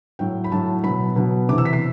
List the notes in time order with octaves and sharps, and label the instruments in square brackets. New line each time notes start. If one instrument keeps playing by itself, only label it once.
[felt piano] A2 F#3 G5
B5
A2 F#3 A5
B2 F#3 B5
B2 F#3
C3 D6
E3
E6
B6
C7